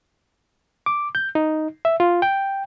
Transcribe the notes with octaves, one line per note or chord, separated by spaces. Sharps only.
D6
G6
D#4
E5
F4
G5